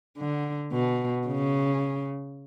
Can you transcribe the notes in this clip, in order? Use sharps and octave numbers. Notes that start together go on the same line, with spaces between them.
D3
B2
C#3